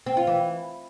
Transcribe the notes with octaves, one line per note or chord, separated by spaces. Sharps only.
C4
F4
E3